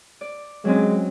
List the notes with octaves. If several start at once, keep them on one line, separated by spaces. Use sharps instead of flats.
D5
F#3 G#3 C4 C#4